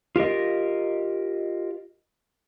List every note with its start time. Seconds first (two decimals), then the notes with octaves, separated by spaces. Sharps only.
0.16 F4 G4 A#4 D#5